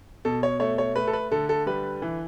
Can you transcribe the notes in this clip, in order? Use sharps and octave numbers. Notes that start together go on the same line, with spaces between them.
B2 A4
C#5
A3 C#5
C#5
A3 B4
A4
B4
D3 A4
A4
G3 B4
E3